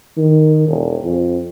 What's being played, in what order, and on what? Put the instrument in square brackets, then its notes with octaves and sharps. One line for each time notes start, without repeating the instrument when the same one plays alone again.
[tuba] D#3
E1
F2